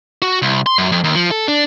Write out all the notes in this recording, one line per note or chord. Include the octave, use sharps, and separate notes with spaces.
F#4
C2
C6
F#2
F2
D#2
F3
A4
D4